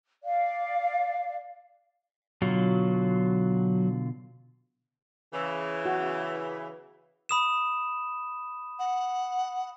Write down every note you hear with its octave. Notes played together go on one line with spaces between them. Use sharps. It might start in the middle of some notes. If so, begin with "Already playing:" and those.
D5 F5
B2 D3 F#3 F4
C#3 E3
F#4
B5 D#6 E7
F#5